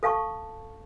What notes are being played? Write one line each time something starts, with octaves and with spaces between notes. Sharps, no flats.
A4 F5 A5 C#6